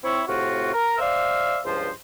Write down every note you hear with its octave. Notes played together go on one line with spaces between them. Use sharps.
C4 E4 C#5
A2 C3 F4 F#4
A#4
C5 D5 E5 F5
C#2 G2 F3 C5